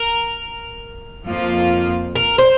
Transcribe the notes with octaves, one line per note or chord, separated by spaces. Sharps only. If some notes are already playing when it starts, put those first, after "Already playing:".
Already playing: A#4
F2 F3 A#3 F4
A#4
C5